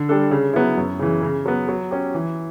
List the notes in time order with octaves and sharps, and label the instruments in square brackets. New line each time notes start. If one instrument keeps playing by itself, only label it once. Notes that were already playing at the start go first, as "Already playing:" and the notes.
Already playing: [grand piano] D3
G3 D4 A4
C#3
F#3 B3 E4
F#2
C#3 E3
C#3
F#3 B3
F#3
C#4 G4
E3